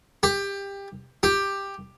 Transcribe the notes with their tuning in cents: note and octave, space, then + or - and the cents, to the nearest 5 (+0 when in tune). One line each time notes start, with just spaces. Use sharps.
G4 +20
G4 +10